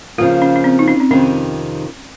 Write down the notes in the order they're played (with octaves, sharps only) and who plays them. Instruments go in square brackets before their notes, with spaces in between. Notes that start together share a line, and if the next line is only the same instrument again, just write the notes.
[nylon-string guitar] C#3 F3 A#3 [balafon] F4
[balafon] C#4
C#4
C4
D#4
C#4
C4
[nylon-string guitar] F2 C3 D#3 [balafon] C#4